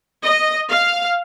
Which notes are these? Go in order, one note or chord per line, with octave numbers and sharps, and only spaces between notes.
D#5
F5